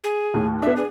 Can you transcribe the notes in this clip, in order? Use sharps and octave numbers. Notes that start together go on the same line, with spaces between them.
G#4
D#2 A2
B3 D4 E5
G#4